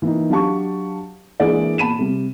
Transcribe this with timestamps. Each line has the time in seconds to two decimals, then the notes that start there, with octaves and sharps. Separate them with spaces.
0.02 E3 A#3 D#4
0.30 F#3 D4 G4 F5 A5 C#6
1.40 E3 G#3 A#3 D4 G#4 D5
1.78 A#2 A5 B5 D#7 E7
1.99 C3 G3